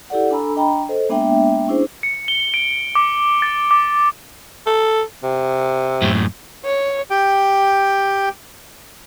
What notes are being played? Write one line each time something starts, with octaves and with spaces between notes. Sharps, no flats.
E4 G4 A4 D5 F#5
D4 A4 G#5 A#5 B5 E6
D4 D#5 G5 A#5 B5
A4 C5 D#5
G#3 A#3 B3 D4 E5 G5
C#4 D4 E4 G#4 C5
C#7
G7
D7
D6
A6
D6
A4
C3
F#2 A2
C#5
G4 G5